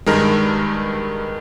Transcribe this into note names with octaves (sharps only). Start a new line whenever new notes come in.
G2 D#3 G#3 A#4